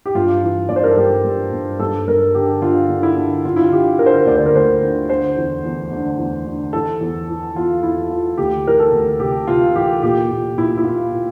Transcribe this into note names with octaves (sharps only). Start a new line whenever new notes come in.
G4
G2 F4
E3
G2 D5
C5
A#4
A4
G2 G4
G2
G2
G2 A4
G2 A#4
D3 G4
D3 F4
D3
E4
D3
D3 F4
E4
F4
D3 G4
D3 A#4
C5
A#4
D2 D5
C5
A#4
D2 C5
D3
D3 C5
E2
E2
D3
E2
D3
E3 A4
E2
E3
E2 F4
E2 E4
E3 F4
D2 G4
E3 A#4
A4
D2
C3 G4
C3 F4
E3 G4
A#2 G4
A#2
A#2 E4
E4
A#2 F4
A#2